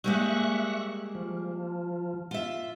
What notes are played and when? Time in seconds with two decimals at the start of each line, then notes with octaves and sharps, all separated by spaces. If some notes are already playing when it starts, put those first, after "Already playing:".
0.04 G3 G#3 A#3 E5 C#6 F#6
1.15 F3
2.31 F4 E5